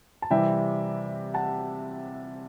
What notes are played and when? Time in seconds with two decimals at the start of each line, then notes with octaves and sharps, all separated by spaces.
0.22 A5
0.31 C3 E3 G3 C4 E5 G5
1.34 F#5 A5